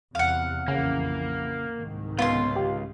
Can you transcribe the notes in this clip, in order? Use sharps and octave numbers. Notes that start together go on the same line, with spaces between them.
E2 C3 F5 F#5
A#1 F2 C#3 E3 A#3
C2 G#2 D#3
C#2 B3 F4 C6
G4